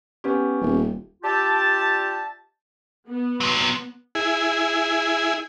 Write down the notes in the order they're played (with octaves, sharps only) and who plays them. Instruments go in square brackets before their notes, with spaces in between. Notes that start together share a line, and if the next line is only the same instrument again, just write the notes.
[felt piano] B3 C#4 G4
[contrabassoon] D#1
[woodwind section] D4 F4 G4 E5 G5 A5
[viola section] B3
[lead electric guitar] C3 F#3
[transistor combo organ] E4 G#4